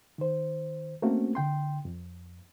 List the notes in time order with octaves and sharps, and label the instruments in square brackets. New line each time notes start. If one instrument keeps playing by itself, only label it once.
[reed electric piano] D#3 C5
A3 A#3 C4 C#4 F#4
D3 G5 C6
F2